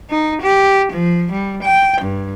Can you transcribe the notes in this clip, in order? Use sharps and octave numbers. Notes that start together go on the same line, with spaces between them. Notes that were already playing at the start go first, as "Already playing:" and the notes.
D#4
G4
F3
G3
G5
G2